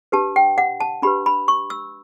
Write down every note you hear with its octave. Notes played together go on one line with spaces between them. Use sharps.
D4 G4 B4 A5
G5
F#5
A5
D4 G4 B4 B5
B5
C#6
E6